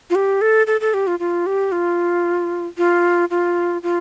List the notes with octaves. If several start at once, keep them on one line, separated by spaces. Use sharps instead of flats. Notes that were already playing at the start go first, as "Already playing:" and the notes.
F4
G4
A4
A4
A4
G4
F4
F4
G4
F4
F4
F4
F4